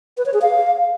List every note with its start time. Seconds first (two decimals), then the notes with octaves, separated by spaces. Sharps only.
0.18 B4
0.26 C#5
0.34 G#4
0.42 F5